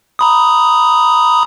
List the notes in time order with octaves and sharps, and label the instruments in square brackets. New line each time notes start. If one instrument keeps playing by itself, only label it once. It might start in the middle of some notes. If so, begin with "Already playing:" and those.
[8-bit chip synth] A#5 B5 D#6